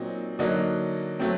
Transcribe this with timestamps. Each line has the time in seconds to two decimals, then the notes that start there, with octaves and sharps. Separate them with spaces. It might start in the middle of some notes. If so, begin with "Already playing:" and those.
Already playing: A#2 F#3 C4 D#4
0.39 D3 F#3 A#3 D#4
1.20 F#3 A3 C4